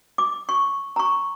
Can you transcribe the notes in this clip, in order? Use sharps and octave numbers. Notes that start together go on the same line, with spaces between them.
D6
C#6
A#5 C#6